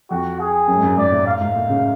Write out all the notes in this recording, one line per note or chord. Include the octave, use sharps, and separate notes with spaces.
F2 F#4
G#4
F#2
G#2
F#2
G#2 D5
A2
F5
G#2
A2
C#3